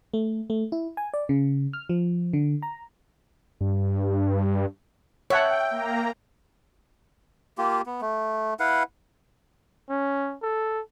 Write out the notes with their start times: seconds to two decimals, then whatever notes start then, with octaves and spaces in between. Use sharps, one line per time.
0.14 A3
0.50 A3
0.72 E4
0.97 G#5
1.14 D5
1.29 C#3
1.73 F6
1.89 F3
2.33 D3
2.62 A#5
3.61 G2
5.30 C#5 E5 F#5 G5 A5
5.71 A#3 A#5
7.58 A#3 F4 G4
7.86 B3
8.01 A3
8.60 E4 B4 F5 F#5
9.89 C#4
10.42 A4